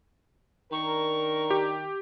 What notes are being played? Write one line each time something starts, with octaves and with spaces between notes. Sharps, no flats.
D#3 D4 A#4 C#6
G4